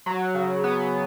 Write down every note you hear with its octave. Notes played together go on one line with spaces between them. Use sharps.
F#3
C#3
B3